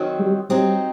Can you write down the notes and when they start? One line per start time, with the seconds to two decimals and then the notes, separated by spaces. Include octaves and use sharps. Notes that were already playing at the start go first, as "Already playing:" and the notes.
Already playing: D#3 F#3 C4
0.19 G3
0.50 F#3 G3 C4 D#4